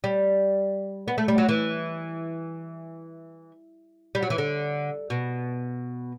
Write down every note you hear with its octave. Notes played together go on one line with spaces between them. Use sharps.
G3
B3
A3
G3
F#3
E3
G3
F#3
E3
D3
B2